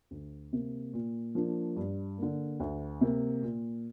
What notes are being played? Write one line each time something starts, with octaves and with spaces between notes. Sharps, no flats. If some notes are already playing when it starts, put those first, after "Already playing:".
D2
C3 A#3
A#2
F3 A#3 D4
G2
D3 A#3
D2
C3 A#3
A#2